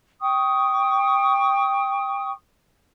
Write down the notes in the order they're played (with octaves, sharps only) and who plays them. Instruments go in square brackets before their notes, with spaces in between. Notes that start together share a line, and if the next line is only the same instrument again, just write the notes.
[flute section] G5 C#6 D#6